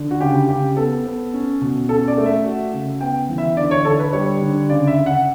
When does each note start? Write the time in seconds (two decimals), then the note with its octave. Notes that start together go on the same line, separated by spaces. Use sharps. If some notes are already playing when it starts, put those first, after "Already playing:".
Already playing: D3
0.11 F#4
0.21 C#3 G4
0.49 C#3 G4
0.77 B3 A4
1.06 B3
1.34 C#4
1.61 B2
1.89 C#4 A4
2.08 D5
2.18 A3
2.26 E5
2.44 F#4
2.72 C#3
3.01 B3 G5
3.29 E3
3.38 E5
3.57 D3 D5
3.71 C#5
3.85 D3 A4
3.99 B4
4.13 G3 C#5
4.41 D3
4.69 C#3 D5
4.87 E5
4.98 C#3
5.06 F#5